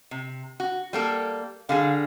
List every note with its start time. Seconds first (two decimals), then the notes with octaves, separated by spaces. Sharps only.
0.11 C3
0.60 F#4
0.93 G3 A#3 A4
1.69 D3 G3 G#4 F5